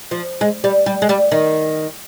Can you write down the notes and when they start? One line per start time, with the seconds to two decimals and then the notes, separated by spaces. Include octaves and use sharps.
0.11 F3
0.41 G#3
0.64 G3
0.86 G3
1.02 G#3
1.09 G3
1.32 D#3